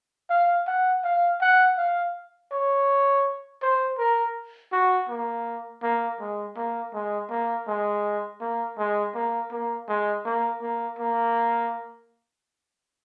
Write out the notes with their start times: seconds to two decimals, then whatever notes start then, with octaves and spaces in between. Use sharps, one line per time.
0.30 F5
0.67 F#5
1.04 F5
1.41 F#5
1.78 F5
2.51 C#5
3.62 C5
3.98 A#4
4.72 F#4
5.09 A#3
5.82 A#3
6.20 G#3
6.56 A#3
6.93 G#3
7.30 A#3
7.67 G#3
8.41 A#3
8.78 G#3
9.15 A#3
9.51 A#3
9.88 G#3
10.25 A#3
10.62 A#3
10.99 A#3